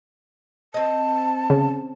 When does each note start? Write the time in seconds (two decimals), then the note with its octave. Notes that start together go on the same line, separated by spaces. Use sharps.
0.74 C4 D#5 A5
1.50 C#3